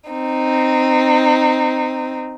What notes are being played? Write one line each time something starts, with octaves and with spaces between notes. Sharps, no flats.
C4 D#4